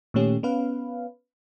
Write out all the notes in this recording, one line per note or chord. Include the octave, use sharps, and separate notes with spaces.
A#2 D#3 A3 C#4 G4
B3 C#4 B4 F5